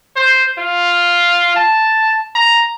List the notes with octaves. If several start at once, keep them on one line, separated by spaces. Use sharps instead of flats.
C5
F4
A5
A#5